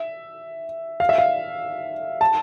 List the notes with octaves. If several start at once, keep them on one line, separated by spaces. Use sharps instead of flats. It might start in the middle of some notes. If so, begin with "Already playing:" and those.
Already playing: E5
F5
E5
F5
A5